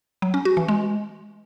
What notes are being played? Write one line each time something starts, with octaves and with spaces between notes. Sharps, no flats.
F#3
C#4
F#4
E3
G#3